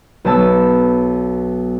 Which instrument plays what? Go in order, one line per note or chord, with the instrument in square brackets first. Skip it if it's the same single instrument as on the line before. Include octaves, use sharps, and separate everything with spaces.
[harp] B1 B3 A5 E6